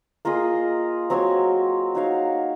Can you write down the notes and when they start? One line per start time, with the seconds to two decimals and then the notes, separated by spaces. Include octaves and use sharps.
0.25 A#3 F4 G#4 D#5
1.10 F#3 C4 F#4 C#5
1.95 D#4 F#4 C#5 F5